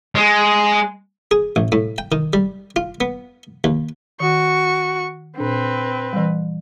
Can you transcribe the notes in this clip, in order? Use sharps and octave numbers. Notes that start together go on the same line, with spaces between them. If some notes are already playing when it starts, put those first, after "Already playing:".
G#3
G#4
A1
A2
G5
D#3
G3
F4
B3
D#2
D#3 F#4 C#6
A#2 C4 D4 B4
E3 G3